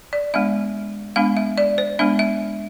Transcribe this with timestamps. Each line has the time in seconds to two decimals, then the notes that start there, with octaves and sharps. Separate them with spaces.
0.13 D5
0.34 G#3 B3 D4 E5
1.16 G#3 B3 D4 F5
1.37 E5
1.58 D5
1.78 C5
1.99 G#3 B3 D4 E5
2.19 E5